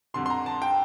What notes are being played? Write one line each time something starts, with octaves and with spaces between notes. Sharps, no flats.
F2 D3 G3 C6
C6
A#5
A5
G5